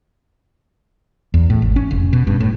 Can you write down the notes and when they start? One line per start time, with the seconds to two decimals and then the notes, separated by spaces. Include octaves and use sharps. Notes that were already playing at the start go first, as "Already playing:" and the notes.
1.34 E2
1.50 A2
1.62 G#1
1.76 C#4
1.91 F1
2.13 B2
2.27 G2
2.40 A2